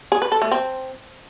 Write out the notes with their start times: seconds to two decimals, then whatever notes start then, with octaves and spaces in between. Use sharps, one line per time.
0.12 G#4
0.22 B4
0.32 A4
0.42 A3
0.52 C4